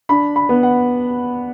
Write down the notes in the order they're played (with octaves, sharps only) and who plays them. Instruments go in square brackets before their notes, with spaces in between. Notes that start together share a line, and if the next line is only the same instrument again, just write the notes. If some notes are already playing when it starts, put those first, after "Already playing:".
[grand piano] D4 B5
B5
B3
F#5